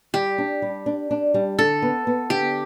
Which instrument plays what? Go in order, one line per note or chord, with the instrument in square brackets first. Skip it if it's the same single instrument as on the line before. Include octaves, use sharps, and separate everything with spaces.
[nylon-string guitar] G3 [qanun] G4
[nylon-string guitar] D4
G3
D4
D4
G3
[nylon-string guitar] D3 [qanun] A4
[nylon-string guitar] B3
B3
[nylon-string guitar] D3 [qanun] G4